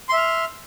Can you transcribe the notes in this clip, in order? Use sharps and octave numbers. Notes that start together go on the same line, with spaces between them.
E5 C6 F6